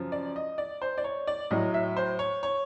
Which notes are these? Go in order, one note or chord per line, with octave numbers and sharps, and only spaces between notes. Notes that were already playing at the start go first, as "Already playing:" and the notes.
Already playing: F#2 C#3 F3
D5
D#5
D5
C5
D5
C#5
D5
A2 F#3 D#5
E5
C5
C#5
C#5